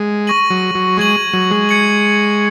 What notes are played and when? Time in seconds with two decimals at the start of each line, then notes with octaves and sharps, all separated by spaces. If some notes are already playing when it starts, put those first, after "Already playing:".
Already playing: G#3
0.27 C#6 A#6 D#7 F#7
0.50 F#3
0.75 F#3
0.97 G#3 C#6 G#6 D#7 F#7
1.33 F#3
1.51 G#3
1.69 G#6 C#7 F#7